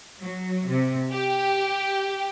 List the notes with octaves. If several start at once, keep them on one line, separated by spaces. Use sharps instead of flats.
F#3
C3
G4